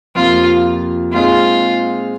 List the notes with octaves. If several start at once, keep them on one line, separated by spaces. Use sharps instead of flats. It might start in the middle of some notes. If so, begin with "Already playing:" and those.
F2 C3 F3 A#3 F4
A#2 G#3 C4 D#4 F4 G#4